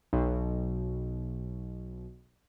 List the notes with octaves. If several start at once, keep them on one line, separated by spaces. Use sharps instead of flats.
B1 B2